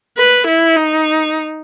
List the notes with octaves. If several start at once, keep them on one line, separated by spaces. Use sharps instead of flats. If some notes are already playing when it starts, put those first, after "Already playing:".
B4
E4
D#4